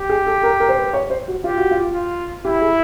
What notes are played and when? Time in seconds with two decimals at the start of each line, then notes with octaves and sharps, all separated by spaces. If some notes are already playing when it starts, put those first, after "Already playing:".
Already playing: G4
0.09 G#4
0.27 A4
0.43 A#4
0.60 A#4
0.69 C5
0.77 B4
0.94 C#5
1.10 C5
1.28 F#4
1.44 F4 G4
1.58 F#4
1.71 F4
1.94 F4
2.45 E4 G4
2.61 G#4